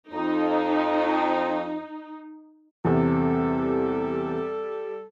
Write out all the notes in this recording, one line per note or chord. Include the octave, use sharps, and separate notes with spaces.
F2 D#4
E2 C3 G3 A4